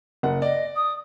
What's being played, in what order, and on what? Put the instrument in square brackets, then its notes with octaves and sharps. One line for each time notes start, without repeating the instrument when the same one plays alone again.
[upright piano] F#1 F#5
[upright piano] D5 [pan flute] D#5
[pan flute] D#6